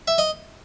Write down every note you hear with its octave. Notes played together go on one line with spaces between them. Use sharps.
E5
D#5